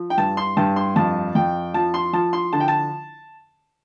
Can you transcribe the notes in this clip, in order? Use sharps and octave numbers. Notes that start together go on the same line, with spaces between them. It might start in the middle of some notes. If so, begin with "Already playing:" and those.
Already playing: F3
G5
G2 A5
C6
G2 A5
C6
F2 A5
F2 G5
F3 A5
C6
F3 A5
C6
D3 A5
G5
A5